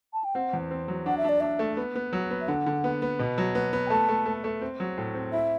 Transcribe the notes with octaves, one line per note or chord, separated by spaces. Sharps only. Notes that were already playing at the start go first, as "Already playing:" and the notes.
A5
G5
C4 F#5
E2
C4
F#3
D4 F#5
E5
D4 D5
D4 E5
A3
B3
B3
F#3
B3
E5
D3 F#5
D3
B3
B3
B2
F#3
B3
B3
G5
A3 A5
A3
A3
A3
C4
F#3
A2
C4
E4 E5